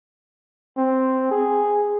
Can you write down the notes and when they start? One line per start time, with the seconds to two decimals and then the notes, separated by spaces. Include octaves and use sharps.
0.77 C4
1.31 G#4